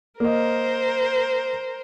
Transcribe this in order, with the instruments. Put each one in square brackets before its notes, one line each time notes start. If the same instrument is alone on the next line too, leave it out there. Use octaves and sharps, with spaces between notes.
[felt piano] A#3 D#5 [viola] A#4 C5